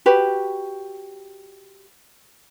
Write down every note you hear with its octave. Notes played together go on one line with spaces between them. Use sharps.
F#4 G4 B4